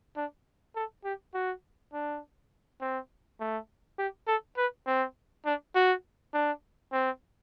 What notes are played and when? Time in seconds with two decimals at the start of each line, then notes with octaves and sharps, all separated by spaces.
0.16 D4
0.75 A4
1.04 G4
1.34 F#4
1.93 D4
2.81 C4
3.40 A3
3.98 G4
4.27 A4
4.57 B4
4.87 C4
5.45 D4
5.75 F#4
6.34 D4
6.92 C4